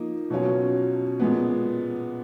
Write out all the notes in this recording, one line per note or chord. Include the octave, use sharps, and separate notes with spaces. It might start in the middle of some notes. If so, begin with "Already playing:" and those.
Already playing: F3 A#3 D#4
B2 F#3 C#4 F4
A#2 G#3 B3